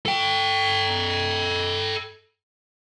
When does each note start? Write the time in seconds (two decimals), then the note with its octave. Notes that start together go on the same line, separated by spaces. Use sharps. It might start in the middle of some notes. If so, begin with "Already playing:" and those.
0.06 A4 G5